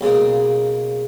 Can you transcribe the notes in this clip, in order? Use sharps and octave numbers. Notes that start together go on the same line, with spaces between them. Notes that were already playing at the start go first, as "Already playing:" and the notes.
B1 C#3 G#3 A#3